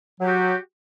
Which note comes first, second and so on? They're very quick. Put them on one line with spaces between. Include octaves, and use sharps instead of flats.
F#3 G4 F#4